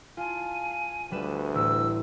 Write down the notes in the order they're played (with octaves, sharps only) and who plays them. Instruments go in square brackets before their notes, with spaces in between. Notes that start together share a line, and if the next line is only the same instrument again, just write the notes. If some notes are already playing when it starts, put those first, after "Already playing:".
[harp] F4 A5 [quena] G#5
[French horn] D2 [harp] G3 B4 E7
[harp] A1 [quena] E6